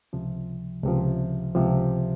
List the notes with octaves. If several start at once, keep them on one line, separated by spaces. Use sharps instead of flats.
C#2 C3 F3
C#2 C3 F3
C#2 C3 F3